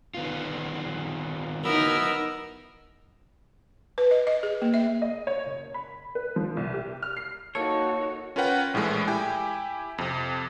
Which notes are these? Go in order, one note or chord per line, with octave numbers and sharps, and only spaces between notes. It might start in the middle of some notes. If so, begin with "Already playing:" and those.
D#3 B3 F4
F#3 B3 D#4 E4 A#4 B5 E6
B4
D#5
D#5
G#4
A#3
E5
D#5
C#5
F#1
B5
B4
F3
C2
G4
F6
C7
A#3 D#4 F#4 A4 C#5
C#4 F4 A#4 B4 F#5 G5
A#1 A2 E3 G#3 A3
E4 G4 G5 G#5
F2 C3